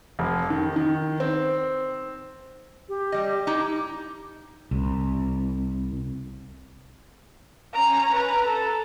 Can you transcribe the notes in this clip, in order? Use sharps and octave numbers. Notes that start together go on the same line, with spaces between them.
F1
D#3
D#3
C4
G4
G3 D#5
D#4 E4 D6
C2
C#4 A#5
B4 A#5
A4